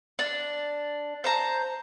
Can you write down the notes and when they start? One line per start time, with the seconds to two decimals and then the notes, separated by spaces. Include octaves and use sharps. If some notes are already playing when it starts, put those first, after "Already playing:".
0.19 D4
1.24 C5 A5 A#5